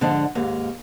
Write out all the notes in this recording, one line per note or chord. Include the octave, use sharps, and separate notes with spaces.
G#2 D3 F3 D4 D#5 F#5
D#2 G#2 A#3